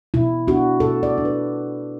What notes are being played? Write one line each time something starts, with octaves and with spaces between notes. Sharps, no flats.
B2 E4
B3 D4 F#4
B2 A4
D5
B3 D4
B4